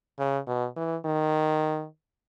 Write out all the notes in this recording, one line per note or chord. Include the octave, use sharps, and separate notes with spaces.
C#3
B2
E3
D#3